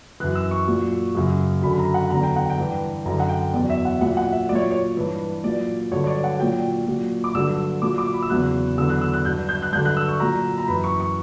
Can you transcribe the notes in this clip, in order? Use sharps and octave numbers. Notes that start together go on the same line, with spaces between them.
F#2 E3 F#6
E6
C#6
A#2 F#3
F#2 C#3 F#3
F#2 D3 F#3 B5
B5
A#5
F#5
E2 D3 F#3 A#5
G5
F#5
G5
G2 E3
F#2 D3 F#3 A#5
F#5
G5
E2 B2 F#3 D5
E5
F#5
A#2 F#3 F#5
F#5
E5
A#2 F#3 C#5 D5
C#5
G2 E3
A#2 F#3 D5
G2 D3 F#3 C#5
C#5
D5
F#5
A#2 F#3 G5
A#2 F#3
D6
G2 D3 F#3 E6
A#2 F#3 D6
D6
B5
E6
E2 C#3 F#3 F#6
E2 D3 F#3 E6
F#6
E6
F#6
G2 F#3 G6
G6
F#6
G2 D3 F#3 G6
F#6
E6
C#6
A#2 F#3 A#5
A#5
F#2 E3 B5
C#6
C#6